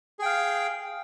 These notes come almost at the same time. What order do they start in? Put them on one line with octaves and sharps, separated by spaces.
G#4 G5 F5